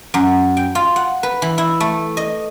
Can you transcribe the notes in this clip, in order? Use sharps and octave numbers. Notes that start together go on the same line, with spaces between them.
F#2
G5
F4
F#5
B4
E3
E4
A3
D#5